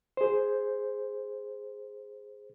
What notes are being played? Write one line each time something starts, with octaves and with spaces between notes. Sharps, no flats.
G#4 C5